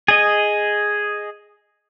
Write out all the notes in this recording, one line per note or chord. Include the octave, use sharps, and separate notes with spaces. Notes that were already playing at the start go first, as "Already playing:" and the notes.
G#4 D#5